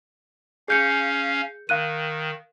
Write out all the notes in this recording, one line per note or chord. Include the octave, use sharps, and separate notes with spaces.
C#4 G#4 F5 G6 C#7
D#3 F5 F#6 D#7